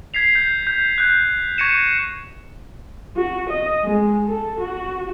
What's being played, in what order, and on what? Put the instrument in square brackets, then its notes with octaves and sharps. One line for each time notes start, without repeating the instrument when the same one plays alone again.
[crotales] G#6 B6 C7 F7
G6
G6
F#6 G6
C#6 G#6 A#6 C#7 D#7 E7
[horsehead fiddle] F#4
D#5
G#3
A4
F#4